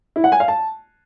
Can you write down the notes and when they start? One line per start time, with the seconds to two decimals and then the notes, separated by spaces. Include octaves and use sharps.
0.16 E4
0.24 F#5
0.32 G#5
0.40 F5
0.48 A5